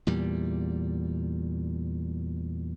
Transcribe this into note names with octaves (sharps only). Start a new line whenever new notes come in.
E2 A#2 G3